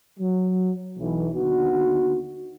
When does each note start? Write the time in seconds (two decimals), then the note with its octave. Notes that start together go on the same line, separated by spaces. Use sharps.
0.19 F#3
0.98 B1 E3
1.34 D#2 D3 B3 D#4 F#4